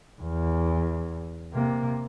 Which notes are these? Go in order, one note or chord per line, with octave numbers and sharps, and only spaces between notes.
E2
C3 A#3